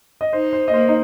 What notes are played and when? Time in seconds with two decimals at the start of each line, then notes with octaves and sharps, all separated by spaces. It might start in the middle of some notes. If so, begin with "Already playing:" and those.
0.21 D#5
0.32 D#4 C5
0.53 C5
0.68 D#5
0.73 A#3 C5
0.88 D#4